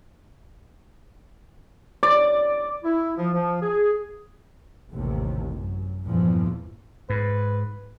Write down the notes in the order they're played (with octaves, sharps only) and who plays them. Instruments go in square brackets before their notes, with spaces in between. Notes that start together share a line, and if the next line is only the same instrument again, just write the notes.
[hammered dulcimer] D5
[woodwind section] E4
F3
F3
G#4
[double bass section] A1 D#2 C3
F#2
E2 G2 A#2 E3 F3
[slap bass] G#2 [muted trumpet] B4